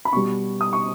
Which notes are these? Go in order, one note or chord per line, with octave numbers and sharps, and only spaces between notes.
B5
B2 G3 C#6
D#6
C#6